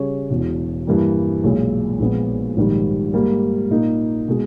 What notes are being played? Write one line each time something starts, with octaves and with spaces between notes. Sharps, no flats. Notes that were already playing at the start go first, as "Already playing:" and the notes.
Already playing: C#3 G3 C#4 G#4 C#5
E1 E2 B2
G2 E3 G3 A#3
B1 A#2 G#3
A#1 A#2 G#3 B3
A#1 G#2 D#3 G3
G#2 G3 A#3
A#2 A#3 D#4
B2 G#3